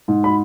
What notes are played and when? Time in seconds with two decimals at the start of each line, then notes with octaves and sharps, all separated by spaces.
0.08 G#2
0.24 B5